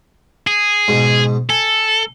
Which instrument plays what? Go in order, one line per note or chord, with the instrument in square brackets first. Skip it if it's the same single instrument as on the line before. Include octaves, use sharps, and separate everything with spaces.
[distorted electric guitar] G#4
[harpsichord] G#2 B2
[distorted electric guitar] A4 [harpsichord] G#5